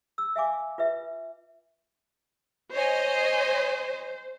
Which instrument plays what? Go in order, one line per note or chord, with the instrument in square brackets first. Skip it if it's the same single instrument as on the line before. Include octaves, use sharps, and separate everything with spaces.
[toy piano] E6
E5 F5 G#5 D6
F4 B4 E5
[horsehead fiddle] C5 [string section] C#5 D#5 G#5